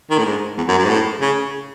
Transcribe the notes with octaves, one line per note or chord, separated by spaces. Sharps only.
D#3
A2
G#2
E2
F#2
F#2
G#2
A2
C#3